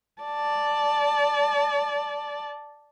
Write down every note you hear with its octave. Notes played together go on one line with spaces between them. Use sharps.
D5 A5